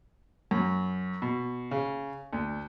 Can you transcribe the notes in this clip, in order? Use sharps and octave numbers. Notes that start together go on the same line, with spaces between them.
F#2
B2
C#3
D2